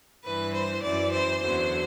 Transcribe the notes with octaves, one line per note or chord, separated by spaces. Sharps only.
G2 E3 B4
C5
F#2 E3 D5
C5
E2 D3 F#3 C5